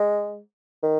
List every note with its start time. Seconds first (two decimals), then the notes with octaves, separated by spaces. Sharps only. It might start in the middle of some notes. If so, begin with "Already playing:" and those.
Already playing: G#3
0.83 D#3